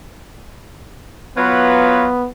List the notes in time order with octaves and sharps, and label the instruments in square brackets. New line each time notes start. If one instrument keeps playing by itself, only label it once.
[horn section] F#3 F4 B4 [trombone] B3